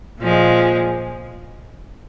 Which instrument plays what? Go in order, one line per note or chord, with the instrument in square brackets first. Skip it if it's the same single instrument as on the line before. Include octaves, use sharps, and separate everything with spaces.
[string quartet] A#2 F3 G#3